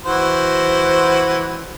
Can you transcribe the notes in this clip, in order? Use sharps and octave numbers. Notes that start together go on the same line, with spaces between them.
E3 F#4 C5